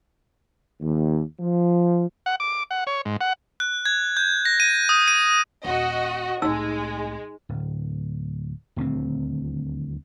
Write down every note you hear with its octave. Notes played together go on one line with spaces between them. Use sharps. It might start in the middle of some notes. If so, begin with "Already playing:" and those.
D#2
F3
F#5
D6
F#5
C#5
G#2
F#5
F#6
G#6
G6
A#6
D#7
D#6
D#7
D#1 F#4 D#5
C2 A2 G#3 D#4 E6
D1
D#1 D2 C3 C4